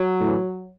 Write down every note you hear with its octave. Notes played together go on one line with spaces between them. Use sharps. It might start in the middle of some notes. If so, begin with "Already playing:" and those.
Already playing: F#3
A2 E3